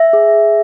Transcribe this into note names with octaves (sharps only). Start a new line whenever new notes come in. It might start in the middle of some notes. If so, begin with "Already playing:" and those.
Already playing: E5
G#4